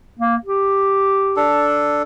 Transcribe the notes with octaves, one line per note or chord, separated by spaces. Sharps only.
A#3
G4
D4 A4